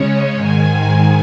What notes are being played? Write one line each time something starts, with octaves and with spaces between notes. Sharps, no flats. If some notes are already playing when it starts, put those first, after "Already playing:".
Already playing: C#3 G#3 C#4 C#5
G#2 D#3 G#3 G#5